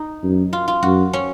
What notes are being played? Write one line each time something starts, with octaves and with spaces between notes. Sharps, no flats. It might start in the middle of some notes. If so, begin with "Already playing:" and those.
Already playing: D#4
F#2
F4
F4
F#2 F#4
C#4